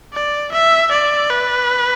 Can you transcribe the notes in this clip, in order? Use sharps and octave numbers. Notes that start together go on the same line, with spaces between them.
D5
E5
D5
B4